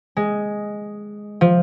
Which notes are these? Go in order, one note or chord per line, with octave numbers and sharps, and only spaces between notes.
G#3
F3